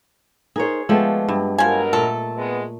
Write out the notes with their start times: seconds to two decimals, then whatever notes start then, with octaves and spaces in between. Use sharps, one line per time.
0.56 D#4 G#4 A#4 C5 C#5
0.89 F3 G#3 A3 B3 G4
1.28 G2
1.58 B2 F3 F#3 A#4 G#5
1.93 A#2 A3 A4
2.36 G#3 B3